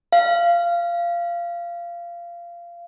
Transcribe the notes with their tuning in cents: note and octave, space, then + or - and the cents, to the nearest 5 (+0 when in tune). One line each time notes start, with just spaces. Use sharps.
F5 -20